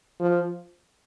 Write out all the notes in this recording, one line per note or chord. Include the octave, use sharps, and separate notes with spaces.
F3